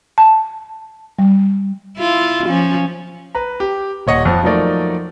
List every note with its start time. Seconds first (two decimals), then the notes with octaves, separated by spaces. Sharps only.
0.18 A5
1.19 G3
1.97 E4 F4
2.46 F3 C#4
3.35 B4 A#5
3.60 G4
4.07 D#1 C#5 D#5 F#5 C#7
4.25 F2 F3
4.43 F3 F#3 A3 A#3 D#4 D5